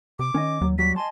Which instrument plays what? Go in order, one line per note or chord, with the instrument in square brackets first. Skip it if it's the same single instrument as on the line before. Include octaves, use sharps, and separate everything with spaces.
[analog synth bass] C3 [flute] D6
[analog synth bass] D#3 [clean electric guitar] C#4 D#5
[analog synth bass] D#2 [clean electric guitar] F#3
[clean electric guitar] F#3 G3 F#4 [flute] B6
[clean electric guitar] D#5 G#5 A5 [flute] C6